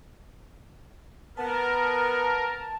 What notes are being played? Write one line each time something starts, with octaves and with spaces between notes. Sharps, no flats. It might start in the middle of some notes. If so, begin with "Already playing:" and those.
B3 A#4 A5